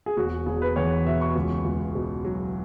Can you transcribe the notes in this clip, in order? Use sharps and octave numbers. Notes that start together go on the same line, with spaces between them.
G#4
E1 F#4
E1 G#4
B4
E2 C#5
B2 E5
C#6
C#2
C#2
B2
F#3